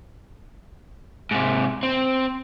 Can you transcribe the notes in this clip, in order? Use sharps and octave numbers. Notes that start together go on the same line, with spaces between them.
G#2 C3
C4